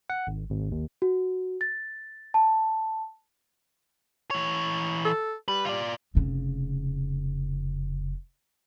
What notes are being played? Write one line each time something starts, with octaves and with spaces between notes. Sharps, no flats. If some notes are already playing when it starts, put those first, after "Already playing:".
F#5
G#1
G#1
D#2
F#4
A6
A5
E3 C#5
A4
G3 B4
F4 D5
F1 C#3